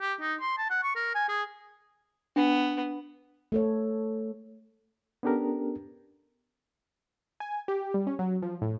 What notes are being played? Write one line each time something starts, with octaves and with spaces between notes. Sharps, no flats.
G4
D#4
C6
A5
F#5
C#6
A#4
G#5
G#4
B3 D4
A3 A4 C#5
B3 C#4 D4 G4 A4 A#4
G#5
G4
G3
C#4
F#3
F3
A2